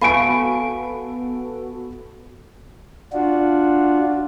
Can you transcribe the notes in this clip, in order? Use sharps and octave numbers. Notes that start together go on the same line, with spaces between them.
B3 F#4 A4 F5 G#5 B5 C#6 D7
D4 F4 F#4